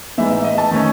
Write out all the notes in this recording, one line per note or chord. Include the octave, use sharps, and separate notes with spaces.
A2 E3 G#3 B3 D#4 E5
E5
D#5
A5
D#3 A3 C#4